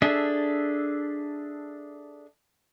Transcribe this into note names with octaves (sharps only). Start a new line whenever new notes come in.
D4 G#4 A4 E5